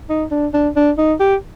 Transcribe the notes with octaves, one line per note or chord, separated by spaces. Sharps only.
D#4
D4
D4
D4
D#4
G4